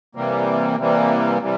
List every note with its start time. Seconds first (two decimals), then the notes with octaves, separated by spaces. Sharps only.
0.15 C3 E3 G3 A#3
0.79 C3 E3 G3 A#3
1.41 C3 E3 G3